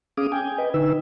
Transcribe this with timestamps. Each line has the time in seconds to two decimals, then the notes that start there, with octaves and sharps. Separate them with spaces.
0.17 C#4 G#4 F5 D6 D#6
0.32 G5 G#5
0.58 B4 D#5
0.74 D3 D#4 B4 E6